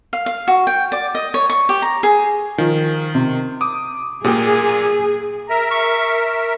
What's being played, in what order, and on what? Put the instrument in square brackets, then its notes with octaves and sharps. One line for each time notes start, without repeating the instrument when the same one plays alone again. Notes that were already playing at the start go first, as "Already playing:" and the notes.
[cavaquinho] F5
F5
F#4
G5
D5
D#5
C#5
C#6
G4
A#5
G#4
[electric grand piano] D#3 [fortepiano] F3
[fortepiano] C3
[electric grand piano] D6 D#6
[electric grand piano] A#2 A#3 [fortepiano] G4 G5 D#6 [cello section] G#4
[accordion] A#4 E5 [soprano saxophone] A#5
[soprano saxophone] C#6